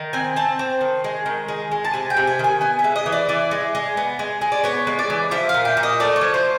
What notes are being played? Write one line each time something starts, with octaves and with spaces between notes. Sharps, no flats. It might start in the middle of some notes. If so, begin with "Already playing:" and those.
Already playing: D#3
C4 G#5
C4 A5
C4
D#3
G#3
D#3
G#3
G#3
A5
C3 G#5
G5
C3
G#5
D#3 G#5
B3 G#5
E5
G#3
D#5
E3
D5
E3 D5
G#3
G#3
B3
G#3
G#3
D5
B3 C#5
G#3
D5
E3
F3 E5
F5
A#2
G5
A#2
D#5
A3 D5
C#5
F3
C5